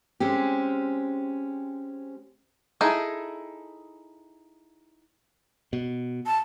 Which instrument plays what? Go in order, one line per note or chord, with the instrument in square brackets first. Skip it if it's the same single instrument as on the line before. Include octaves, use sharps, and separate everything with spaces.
[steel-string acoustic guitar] G#3 C4 C#4 G4
[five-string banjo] D#4 E4 G#4 A4
[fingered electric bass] B2
[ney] A5